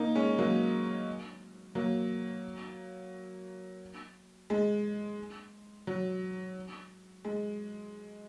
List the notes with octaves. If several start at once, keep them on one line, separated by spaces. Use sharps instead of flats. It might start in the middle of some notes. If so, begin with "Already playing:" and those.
Already playing: A#3 D#4
G#3 C#4
F#3 A#3
F#3 A#3
G#3
F#3
G#3